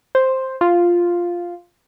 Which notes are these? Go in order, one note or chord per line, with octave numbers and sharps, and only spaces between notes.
C5
F4